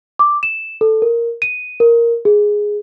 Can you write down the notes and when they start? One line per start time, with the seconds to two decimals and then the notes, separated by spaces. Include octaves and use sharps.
0.19 D6
0.43 E7
0.81 A4
1.02 A#4
1.42 D#7
1.80 A#4
2.25 G#4